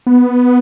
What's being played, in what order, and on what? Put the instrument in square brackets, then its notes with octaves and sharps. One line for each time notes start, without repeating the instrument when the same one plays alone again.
[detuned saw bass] B3